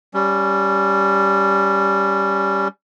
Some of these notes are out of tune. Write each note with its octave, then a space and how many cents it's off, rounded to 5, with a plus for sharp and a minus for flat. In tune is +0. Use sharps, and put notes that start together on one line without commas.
G3 +0 C#4 +15